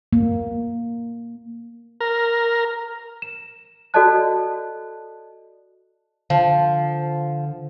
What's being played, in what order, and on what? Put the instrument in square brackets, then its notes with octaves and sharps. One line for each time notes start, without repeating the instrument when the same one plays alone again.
[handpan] A#3
[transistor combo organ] A#4
[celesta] E7
F#4 A4 D5 D#5 A5 F#6
[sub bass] D3 [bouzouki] F3